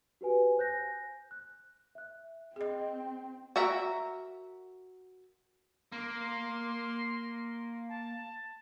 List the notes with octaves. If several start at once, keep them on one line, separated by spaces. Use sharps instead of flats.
F#4 G4 B4 G#5
C5 G#5 F#6 G6 A#6
F#6
E5 F#6
C4 G#4 D#5
F#4 A#4 E5 A#5
A#3 C6
A5